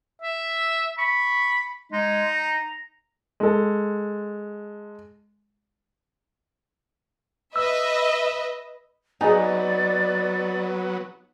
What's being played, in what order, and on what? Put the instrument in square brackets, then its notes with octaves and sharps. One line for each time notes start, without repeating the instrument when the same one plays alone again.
[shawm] E5
[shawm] B5 [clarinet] C#6
[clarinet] G#3 [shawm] D#4
[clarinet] A#5
[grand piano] G#3 A4
[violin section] B4 D#5 E5 [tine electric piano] E6
[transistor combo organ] F#3 B3 [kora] D#4 [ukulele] G#4 G#5 [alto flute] D5